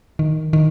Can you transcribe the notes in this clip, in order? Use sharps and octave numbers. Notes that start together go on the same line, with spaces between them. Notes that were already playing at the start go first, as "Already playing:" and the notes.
D#3
D#3